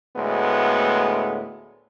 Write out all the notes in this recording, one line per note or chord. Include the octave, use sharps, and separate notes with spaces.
D2 A2 G#3 B3